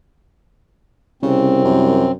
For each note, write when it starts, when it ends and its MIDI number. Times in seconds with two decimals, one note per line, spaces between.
1.23 2.10 36
1.23 1.64 49
1.23 2.12 60
1.65 2.17 42